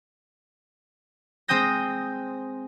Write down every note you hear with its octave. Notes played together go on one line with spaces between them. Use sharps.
G#3 C4 G5 D#6 G6 A#6